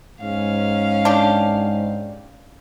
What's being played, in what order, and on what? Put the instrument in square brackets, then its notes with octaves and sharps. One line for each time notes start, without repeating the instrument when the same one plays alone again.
[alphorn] G#2 [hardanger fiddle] C#4 F5
[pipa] D4 G4